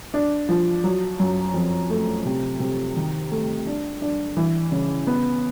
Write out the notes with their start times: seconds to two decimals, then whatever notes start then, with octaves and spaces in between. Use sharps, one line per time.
0.14 D4
0.49 F3
0.84 F#3
1.20 F#2
1.54 F2
1.90 A3
2.26 C3
2.60 C3
2.96 D#3
3.31 A3
3.67 D4
4.02 D4
4.37 E3
4.72 C#3
5.07 B3